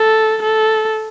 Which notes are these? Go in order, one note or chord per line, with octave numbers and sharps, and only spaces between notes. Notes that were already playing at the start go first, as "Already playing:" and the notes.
Already playing: A4
A4